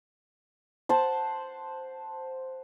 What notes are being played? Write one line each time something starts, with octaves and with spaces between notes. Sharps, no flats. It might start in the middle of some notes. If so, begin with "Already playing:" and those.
C5 F#5 A5